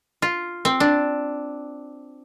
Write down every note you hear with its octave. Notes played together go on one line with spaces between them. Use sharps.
F4
C4
D4